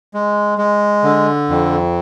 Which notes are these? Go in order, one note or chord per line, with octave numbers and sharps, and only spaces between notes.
G#3
G#3
D3
F2